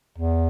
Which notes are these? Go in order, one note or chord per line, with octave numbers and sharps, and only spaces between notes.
E2